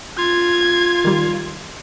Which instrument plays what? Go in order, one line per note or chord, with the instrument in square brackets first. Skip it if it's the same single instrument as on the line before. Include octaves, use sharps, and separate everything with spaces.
[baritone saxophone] F4 [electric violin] G#6
[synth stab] D#3 G3